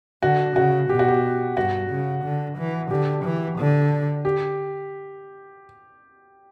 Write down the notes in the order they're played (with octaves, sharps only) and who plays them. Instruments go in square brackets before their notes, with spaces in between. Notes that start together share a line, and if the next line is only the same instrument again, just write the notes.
[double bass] D3 [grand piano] F#4
[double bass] C#3 [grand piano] F#4
[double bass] B2 [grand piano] G4
[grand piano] F#4
G4
[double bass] G2 [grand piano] F#4
[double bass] C#3
D3
E3
[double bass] D3 [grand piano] G4
[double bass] E3
D3
[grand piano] G4